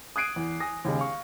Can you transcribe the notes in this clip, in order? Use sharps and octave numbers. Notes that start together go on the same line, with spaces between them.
D#6 F#6 G#6 C7 D7 D#7
E2
G#5 D#6 A#6
D#2 C#3 G#3
F5 C#6